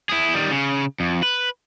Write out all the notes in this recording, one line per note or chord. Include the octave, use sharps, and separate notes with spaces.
E4 G#4
D#3 G3
C#3
F2
B4